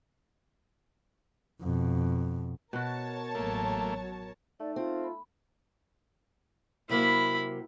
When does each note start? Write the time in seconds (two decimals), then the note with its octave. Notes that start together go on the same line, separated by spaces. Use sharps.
1.61 F2 B2
2.73 B2 F#4 A#4 C#5 A5
3.35 A1 F#3 A3 A#3
4.60 A3 D#4 D5
4.76 C4 F4
5.04 B5
6.89 C3 F#3 A#3 E4 B5